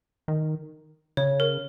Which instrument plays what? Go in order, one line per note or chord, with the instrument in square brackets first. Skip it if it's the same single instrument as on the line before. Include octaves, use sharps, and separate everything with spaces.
[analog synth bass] D#3
[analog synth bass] C#3 [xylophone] C#5
[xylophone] A#4